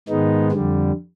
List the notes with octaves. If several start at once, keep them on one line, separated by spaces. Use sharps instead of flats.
G#2 D#3 G#3 B3 D#4
F2 D3 G3